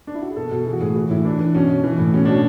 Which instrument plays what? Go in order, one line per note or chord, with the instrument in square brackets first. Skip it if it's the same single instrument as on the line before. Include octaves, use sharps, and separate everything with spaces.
[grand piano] D4
E4
F#4
G#4
B2 A4
B2
E3 G#4
F#4
A2 G#4
E3 F#4
A2 E4
E3 D4
E3
B2 C#4
B2
E3
A2
B2 C#4
B2 D4